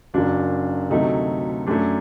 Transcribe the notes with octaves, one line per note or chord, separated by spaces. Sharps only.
F#1 F#2 F#3 D4
D2 C3 F#3 A3 D#4
F#2 F#3 A3 D4